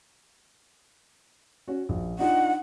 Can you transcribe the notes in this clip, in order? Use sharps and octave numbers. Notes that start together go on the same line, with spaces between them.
C#4 F#4
A#1
D4 D#4 F4 F#5